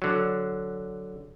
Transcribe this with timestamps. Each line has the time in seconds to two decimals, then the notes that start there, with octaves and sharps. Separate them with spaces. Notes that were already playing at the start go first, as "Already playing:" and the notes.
0.02 D3 F#3